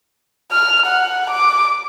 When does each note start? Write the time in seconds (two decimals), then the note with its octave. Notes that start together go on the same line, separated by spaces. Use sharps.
0.52 F6
0.86 F#5
1.30 D6